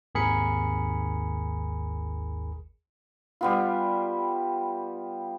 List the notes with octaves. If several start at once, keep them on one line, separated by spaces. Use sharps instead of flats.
G#1 D#2 G#4 A#4 B5 C#7
G3 B3 F4